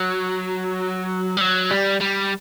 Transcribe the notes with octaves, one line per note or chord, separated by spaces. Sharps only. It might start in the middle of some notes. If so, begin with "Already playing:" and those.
Already playing: F#3
G3
F#3
G3
G3